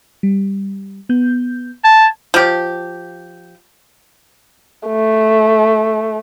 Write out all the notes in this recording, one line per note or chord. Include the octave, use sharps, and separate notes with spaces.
G3
B3 G6
A5 G#6
F3 G4
A3